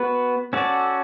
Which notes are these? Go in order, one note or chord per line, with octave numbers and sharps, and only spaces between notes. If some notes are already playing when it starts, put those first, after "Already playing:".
Already playing: B3 F#4 B4
C#4 F#4 A4 D5